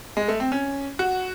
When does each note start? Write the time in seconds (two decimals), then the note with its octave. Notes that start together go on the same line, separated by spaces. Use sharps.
0.17 G#3
0.28 A3
0.40 C4
0.52 C#4
0.99 F#4